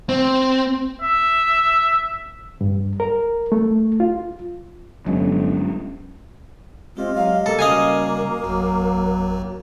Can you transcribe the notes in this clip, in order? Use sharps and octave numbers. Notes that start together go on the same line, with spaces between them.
C4
E5
G2
A#4
A3
F4
G1 F#3 G#3 C#4
G#3 C4 F4 G4 D#5
F#3 F5
B2 A#3 A4
C#3 G3 C#4 F#4 D#5 F5 G#5
G#1 F2 F#3 F#4